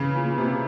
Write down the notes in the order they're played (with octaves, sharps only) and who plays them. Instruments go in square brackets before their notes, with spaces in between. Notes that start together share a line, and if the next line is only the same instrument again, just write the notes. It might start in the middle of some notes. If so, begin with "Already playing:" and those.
Already playing: [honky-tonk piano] C#3 E3
A#2
A#2
C3